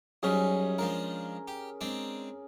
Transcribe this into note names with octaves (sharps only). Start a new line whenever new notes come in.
F#2 G3 C#4 D#4 G#4
F3 G#3 D4 A#4
G4
G#3 C4 D4